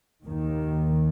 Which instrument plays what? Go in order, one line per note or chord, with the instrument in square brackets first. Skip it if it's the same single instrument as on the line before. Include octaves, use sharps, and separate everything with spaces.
[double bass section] D#2 D#3